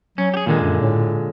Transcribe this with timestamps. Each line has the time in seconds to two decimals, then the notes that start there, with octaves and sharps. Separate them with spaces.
0.18 F#3 C#4
0.34 G4 G#4
0.46 A#2 D3 D#3 G#3
0.61 F#2
0.81 A2